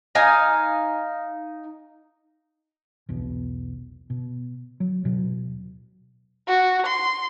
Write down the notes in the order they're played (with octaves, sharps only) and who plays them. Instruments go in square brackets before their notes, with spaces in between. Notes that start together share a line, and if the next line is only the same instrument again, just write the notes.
[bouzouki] D#4 D#5 F5 G#5
[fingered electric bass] B1 E2 B2
B2
F#3
D#1 B2 F#3
[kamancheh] F#4
C6